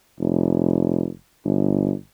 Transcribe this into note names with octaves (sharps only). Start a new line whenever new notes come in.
F1
G1